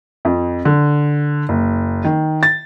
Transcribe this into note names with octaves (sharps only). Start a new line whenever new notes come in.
F2
D3
F#1
D#3
A6